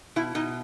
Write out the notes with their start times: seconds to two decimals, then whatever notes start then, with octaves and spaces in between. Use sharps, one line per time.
0.16 B2 E4
0.35 B2 D#4